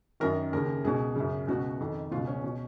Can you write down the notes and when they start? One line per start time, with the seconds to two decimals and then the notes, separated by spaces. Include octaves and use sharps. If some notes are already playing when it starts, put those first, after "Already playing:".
0.20 F#2 D#3 A#4
0.53 D#2 C#3 A#4
0.84 C#2 B2 G#4
1.16 F#2 C#3
1.47 C#2 B2 F#4
1.80 F2 D#3
2.11 B2 F4
2.16 C#2
2.27 C#4
2.44 B2